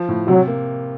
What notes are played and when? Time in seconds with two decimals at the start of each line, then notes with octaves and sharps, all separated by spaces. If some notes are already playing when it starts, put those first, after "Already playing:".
Already playing: F3
0.09 A2
0.28 C3 F#3
0.48 A#3